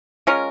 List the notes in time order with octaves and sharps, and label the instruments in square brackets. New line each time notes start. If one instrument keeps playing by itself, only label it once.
[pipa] G#3 C#4 F4 A#4